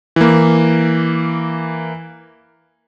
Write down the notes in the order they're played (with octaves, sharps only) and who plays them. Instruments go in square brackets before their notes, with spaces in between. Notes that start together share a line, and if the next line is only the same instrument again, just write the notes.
[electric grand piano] E3 A#3